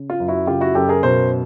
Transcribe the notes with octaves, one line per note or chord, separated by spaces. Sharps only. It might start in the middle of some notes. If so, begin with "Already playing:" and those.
Already playing: C#3
F4
F#2
E4 F#4
C#3 F4 G4
E4 F#4
F#2 G4 A4
G#4 A#4
B2 A#4 C5